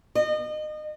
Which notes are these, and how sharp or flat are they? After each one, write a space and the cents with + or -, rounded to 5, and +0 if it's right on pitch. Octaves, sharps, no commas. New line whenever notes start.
D#5 -30